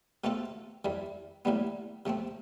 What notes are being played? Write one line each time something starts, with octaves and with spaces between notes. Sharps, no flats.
B2 A3 C4 F4 A4
F2 E3 G3
A1 A2 E3 G3 B3
C3 F3 A3 C4